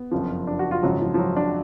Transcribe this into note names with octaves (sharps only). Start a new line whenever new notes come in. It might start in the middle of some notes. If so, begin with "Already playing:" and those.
Already playing: B3
F#1 F2 C#3 F3
D4
F#4
F4
G#1 F#2 C#3 F3 F#3
F3
F3
F#3
D4